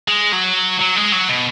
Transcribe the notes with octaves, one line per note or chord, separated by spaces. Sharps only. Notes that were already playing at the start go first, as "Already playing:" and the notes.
G#3
F#3
F#3
G#3
F#3
B2